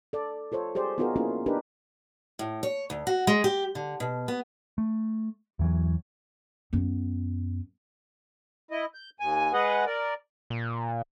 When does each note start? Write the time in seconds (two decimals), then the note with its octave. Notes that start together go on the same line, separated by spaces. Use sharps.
0.13 A4 D5
0.52 F4 A4 C5 C#5
0.75 G4 G#4 C5 D5
0.98 B3 D#4 F4 F#4 G#4 A#4
1.16 A#3 C#4 E4 F4 G#4
1.46 D4 D#4 G4 A#4 B4
2.39 A2
2.63 C#5
2.90 D2
3.07 F#4
3.27 G#3
3.44 G4
3.75 D3
4.00 B2
4.28 B3
4.78 A3
5.59 E2 E3 F#3
6.73 F#2 B3
8.71 E4 D#5
8.94 G6
9.20 D#2 G#5
9.53 G#3 G#4 B4 D#5 F#5
9.86 A#4 D5
10.50 A#2